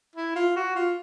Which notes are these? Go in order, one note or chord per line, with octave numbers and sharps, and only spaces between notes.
E4
F4
F#4
F4